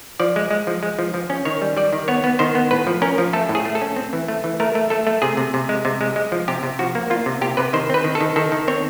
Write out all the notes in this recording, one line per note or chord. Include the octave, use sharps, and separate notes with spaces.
F3 D5
G#3
G#3
F3
G#3
F3
F3
C#4
D#3 C#5
G3
G3 D5
D#3
B3 C#5
B3
D#3 C5
B3
A2 B4
F3
C#4 A#4
F3
A3 A4
A2
G#4
A3
A4
C#4
C4
E3
A3
E3
A3 A#4
A3
A3 A4
A3
C3 G#4
C3
C3
G#3
C3
G#3
G#3
F3
C3 G4
C3
F3 F#4
A#3
A#3 F4
C3
C3 G4
C3 B4
D#3 C5
C4 B4
D#3
A4
D#3
D#3 A4
D#3
C4 C#5